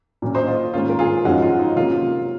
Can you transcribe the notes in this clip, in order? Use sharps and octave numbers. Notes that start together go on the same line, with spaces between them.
A#2 F#3 C#4
C5 D#5
F4
G#2 D#3 A#3 C#4 F4
A#4
F4 G#4
F#2 F3 G#3 C#4 D#4 F#4
F4
D#4
C3 F#3 A#3 C#4 F4